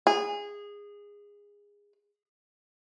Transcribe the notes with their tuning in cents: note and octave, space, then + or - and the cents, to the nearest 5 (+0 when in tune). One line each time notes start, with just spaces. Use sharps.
G#4 -20